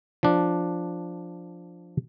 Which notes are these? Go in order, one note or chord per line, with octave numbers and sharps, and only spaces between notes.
F3 D4